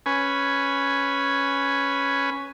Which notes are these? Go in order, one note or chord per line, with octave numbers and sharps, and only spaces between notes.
C#4 B4 G#5